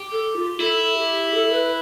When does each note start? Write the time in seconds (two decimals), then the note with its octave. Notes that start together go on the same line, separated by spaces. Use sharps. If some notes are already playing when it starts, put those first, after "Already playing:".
Already playing: G4
0.12 A4
0.36 F4
0.60 E4 A4
0.97 G4
1.34 A4
1.53 B4